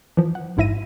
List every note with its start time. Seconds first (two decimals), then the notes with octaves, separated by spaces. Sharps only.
0.17 E3 F3
0.35 F#5
0.57 A1 G#2 E4 E5 A#6 D#7